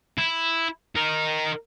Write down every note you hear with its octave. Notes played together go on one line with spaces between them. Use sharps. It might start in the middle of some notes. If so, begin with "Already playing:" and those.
E4
D#4 A#4